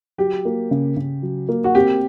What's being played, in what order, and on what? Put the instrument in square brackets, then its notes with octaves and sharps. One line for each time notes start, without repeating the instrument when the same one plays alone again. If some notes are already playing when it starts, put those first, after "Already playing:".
[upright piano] F#3 [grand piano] G4
[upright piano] A#3
C#3
C#3
F#3
A#3
[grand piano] F#4
[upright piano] C4 [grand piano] G4